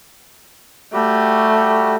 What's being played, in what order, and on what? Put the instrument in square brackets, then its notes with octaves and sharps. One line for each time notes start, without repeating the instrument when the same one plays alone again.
[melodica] G3 F#4 G4 [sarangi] A3